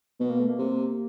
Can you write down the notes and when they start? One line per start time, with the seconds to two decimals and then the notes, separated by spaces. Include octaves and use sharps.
0.19 B2 B3
0.30 A#3
0.39 A3
0.49 A#3
0.59 C3